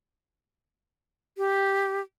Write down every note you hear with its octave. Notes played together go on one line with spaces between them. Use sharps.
G4